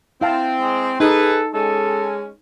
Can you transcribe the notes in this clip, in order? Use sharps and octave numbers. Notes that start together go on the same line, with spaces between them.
C4 E4 F5 A5
G#3
D#4 G#4 A4 B4
G#3 C#4 A4